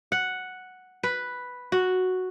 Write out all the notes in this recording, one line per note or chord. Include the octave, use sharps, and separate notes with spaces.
F#5
B4
F#4